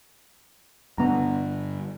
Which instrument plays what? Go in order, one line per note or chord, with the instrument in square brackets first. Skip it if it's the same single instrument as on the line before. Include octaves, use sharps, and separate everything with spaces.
[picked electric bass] G2 D3 [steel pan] B3 A#5